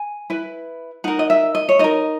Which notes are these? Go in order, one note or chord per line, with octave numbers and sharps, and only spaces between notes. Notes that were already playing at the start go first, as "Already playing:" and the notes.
Already playing: G#5
E4 B4
D#4 A#4 F#5
D#5
E5
D#5
C#5
D#4 A#4 D#5